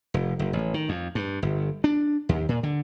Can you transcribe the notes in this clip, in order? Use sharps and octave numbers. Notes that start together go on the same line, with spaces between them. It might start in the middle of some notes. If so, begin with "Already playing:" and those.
F1
F#1
A1
D#3
F2
G2
G1
D4
D#2
A#2
D3